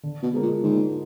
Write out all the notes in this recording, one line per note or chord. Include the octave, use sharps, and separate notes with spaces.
D3
B2
G#3 D4 F4 A#4
A#2
G#2 D3